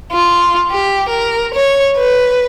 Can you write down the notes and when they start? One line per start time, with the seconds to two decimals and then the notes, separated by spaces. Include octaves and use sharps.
0.11 F4
0.71 G4
1.09 A#4
1.55 C#5
1.97 B4